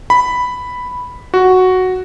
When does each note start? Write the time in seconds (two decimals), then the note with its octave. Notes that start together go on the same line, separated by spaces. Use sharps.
0.10 B5
1.34 F#4